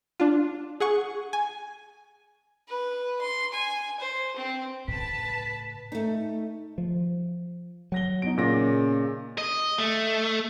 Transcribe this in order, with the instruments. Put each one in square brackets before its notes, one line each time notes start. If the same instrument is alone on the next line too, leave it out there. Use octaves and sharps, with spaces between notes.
[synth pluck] D4 F4
G#4 F#5 C#6
G#5
[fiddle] B4
C6
G#5
C5
C4
[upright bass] A2 C#3 [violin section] B4 A5 [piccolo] B6
[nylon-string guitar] A3 D#4
[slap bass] F3
[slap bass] F#3 [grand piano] F#5 A#6 G7
[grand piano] B2 D#4 [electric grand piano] D7
[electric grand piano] A#2 A#6 [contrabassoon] C#3 [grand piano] D#5 D6
[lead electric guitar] D#5
A3